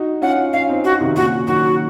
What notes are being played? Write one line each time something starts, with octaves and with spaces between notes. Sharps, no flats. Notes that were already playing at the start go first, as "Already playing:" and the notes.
Already playing: D#4 F#4
C#4 F4 F#5
C#4 F4 F5
C4 D#4
F#4
C3 D#3
A#2 C#3 F#4
D#3 F#3 F#4